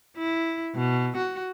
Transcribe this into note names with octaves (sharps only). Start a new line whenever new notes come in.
E4
B2
F#4